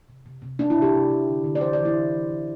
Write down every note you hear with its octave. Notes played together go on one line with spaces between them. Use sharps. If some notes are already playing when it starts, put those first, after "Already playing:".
C3
C3
C3
C3 D4
E4
C3
G4
C3
C3
D3
D3
D5
E3 C5
D5
E3
E4
E3
E3
E3